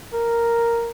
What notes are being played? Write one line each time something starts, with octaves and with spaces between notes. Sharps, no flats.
A#4